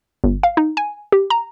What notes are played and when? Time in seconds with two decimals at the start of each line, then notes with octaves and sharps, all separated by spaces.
0.24 G1
0.43 F5
0.57 D#4
0.77 G#5
1.12 G4
1.30 A#5